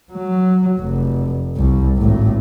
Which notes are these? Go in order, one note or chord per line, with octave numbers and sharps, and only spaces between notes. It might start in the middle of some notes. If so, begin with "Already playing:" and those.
F#3
F1
C2
G#1 A2